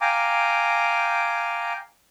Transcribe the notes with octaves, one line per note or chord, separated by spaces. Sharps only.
F5 G5 G#5 A#5 D6